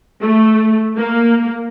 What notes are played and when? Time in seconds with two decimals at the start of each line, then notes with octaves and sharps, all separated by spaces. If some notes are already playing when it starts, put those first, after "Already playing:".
0.21 A3
0.96 A#3